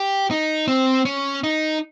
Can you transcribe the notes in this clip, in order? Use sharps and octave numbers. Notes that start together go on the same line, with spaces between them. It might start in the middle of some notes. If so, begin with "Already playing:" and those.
Already playing: G4
D#4
C4
C#4
D#4